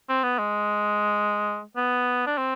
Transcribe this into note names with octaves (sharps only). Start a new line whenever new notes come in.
C4
B3
G#3
B3
D4
C4